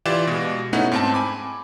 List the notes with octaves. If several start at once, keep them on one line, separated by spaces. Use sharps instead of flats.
E3 F4 G4 D5 E7
B2 G#3
A3 B3 C#4 D#4 E4 F#5
G#2 C4 A5
G#5 B5 D6